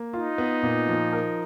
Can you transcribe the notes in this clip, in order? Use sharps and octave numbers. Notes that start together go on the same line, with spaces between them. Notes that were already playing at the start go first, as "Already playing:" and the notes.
Already playing: A#3
D#4 F4
B3
A#2
F3
A#4